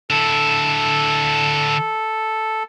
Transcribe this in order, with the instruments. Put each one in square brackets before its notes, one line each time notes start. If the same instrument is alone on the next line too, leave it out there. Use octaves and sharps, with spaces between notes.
[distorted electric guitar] D3 E4 [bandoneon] A4